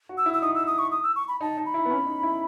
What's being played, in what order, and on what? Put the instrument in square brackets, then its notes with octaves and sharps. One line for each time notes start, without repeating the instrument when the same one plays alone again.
[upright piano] F#4
[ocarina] E6
[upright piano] E4
[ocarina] E6
[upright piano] D#4 [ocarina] D#6
[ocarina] E6
D#6
C#6
D#6
E6
C#6
B5
[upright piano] D#4 [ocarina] A5
[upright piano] D#4
[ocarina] B5
[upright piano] E4
B3
C#4
D#4
E4